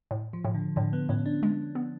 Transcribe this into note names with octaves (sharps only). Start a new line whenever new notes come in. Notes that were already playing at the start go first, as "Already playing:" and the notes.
A2
F3
A2
D3
A2 D3
B3
A2 C#4
D4
G#3
B3